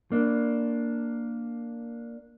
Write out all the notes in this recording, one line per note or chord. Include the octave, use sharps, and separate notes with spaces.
A#3 D4